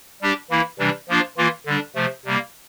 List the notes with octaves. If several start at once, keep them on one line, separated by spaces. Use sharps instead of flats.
G3 D4 G4
E3 A#3 E4
C3 E3 G3 D4
F3 A#3 D4 F4
E3 A#3 F4
D3 G3 D4
C3 F3 A3
C3 G3 A#3